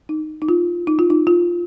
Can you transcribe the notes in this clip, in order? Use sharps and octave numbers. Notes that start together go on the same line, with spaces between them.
D#4
D#4
F4
D#4
F4
D#4
F4